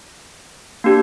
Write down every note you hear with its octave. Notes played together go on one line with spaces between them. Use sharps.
A#3 D4 G4